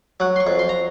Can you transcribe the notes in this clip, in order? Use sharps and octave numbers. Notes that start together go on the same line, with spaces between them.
F#3 F#5
C6
C#6
F2
C6
A#5